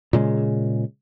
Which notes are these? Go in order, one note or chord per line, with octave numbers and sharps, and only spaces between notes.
A#2 C#3 G#3